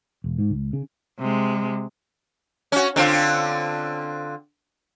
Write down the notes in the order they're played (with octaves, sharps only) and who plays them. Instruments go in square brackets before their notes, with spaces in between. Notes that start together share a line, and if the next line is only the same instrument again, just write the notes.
[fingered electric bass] E1
G#2
C#2
C#3
[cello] C3 G#3
[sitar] C#4 F#4
D3 C4 F4